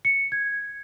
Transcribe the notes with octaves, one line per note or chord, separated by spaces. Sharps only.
C#7
G#6